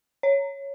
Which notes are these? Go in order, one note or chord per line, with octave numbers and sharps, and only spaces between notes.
C#5